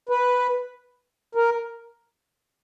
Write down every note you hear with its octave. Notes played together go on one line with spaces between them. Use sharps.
B4
A#4